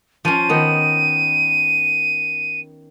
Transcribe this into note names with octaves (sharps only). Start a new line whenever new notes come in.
F3 C#4 D#7
D#3 B3